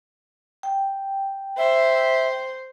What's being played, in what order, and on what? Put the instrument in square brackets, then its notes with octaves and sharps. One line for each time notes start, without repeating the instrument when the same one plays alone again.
[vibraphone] G5
[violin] C5 [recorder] E5